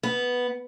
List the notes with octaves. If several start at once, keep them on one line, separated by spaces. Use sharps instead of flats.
B3